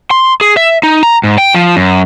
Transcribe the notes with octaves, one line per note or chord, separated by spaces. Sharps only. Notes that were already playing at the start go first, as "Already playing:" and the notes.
C6
G#4
E5
D#4
A#5
G#2
G5
F3
F#2